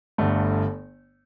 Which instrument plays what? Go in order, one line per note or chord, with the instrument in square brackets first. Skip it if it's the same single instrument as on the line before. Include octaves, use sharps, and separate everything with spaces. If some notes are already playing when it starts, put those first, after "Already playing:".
[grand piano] G1 G2 D3 A3